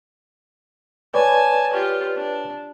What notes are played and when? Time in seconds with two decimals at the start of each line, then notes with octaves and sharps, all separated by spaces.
1.14 B4 C#5 D5 G#5 A5
1.73 F4 G4
2.16 D4